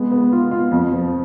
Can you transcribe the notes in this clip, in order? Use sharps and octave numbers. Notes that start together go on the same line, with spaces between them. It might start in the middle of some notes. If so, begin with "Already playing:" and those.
Already playing: G#3 B3
B3
F4
F4
F2
F3